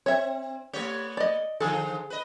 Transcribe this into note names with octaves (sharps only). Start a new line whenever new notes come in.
C4 C#5 E5
A3 B3 G4 C#5
D5 D#5
D3 F3 G#4 A4
B4 D#5